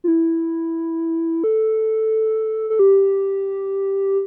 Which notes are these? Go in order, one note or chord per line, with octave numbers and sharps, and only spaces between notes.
F4
E4
A4
A4
G4